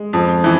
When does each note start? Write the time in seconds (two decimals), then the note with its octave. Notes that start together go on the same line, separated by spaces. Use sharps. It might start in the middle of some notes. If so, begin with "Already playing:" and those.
Already playing: G#3
0.13 F2
0.44 E3